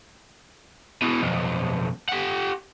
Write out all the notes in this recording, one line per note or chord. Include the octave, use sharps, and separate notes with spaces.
B2 E3
B1 F2
G4 F#5